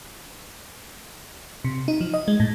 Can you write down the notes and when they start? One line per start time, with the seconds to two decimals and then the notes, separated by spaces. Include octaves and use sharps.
1.64 C3
1.88 D#4
2.01 F3
2.14 D#5
2.28 G#3
2.40 A2